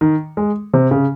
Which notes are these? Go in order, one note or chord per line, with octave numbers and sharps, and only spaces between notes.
D#3
G#3
C3
C#3